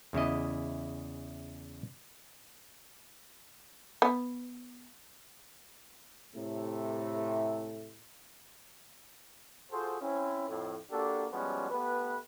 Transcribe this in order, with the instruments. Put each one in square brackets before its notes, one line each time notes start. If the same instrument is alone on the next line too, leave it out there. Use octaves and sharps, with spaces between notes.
[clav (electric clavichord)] E2 C#3 E4 D#5
[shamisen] B3
[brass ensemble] A2 C3 A3
[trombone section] F4 F#4 G#4 A4 C5
C4 C#4 E4
F2 A2
A#3 D4 F#4 G4 A4
F3 G3 G#3 B3 C#4 F#4
A3 B3 G4 B4